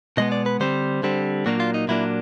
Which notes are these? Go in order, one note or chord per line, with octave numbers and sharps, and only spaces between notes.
B2 G#3 B3 D#5
D5
B4
D3 G3 C4 C5
D3 G3 C4
A#2 F#3 A#3 D4 F#4
F4
D#4
A#2 F#3 A#3 D4 E4